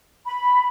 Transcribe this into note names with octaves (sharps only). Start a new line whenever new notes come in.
B5